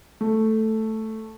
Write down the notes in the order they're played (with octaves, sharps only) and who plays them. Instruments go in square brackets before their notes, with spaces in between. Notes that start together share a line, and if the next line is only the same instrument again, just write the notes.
[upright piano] A3